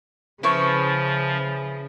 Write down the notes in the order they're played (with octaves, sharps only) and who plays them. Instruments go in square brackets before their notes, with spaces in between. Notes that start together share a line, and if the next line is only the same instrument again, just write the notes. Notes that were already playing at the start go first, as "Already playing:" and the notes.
[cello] C#3 [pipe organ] F3 [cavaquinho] E4 B4 C#6